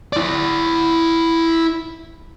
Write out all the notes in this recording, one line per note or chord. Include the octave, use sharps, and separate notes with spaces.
E4 D5